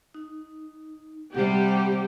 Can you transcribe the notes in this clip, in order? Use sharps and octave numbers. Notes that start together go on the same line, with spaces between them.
D#4
C3 G3 G4 C5 F#5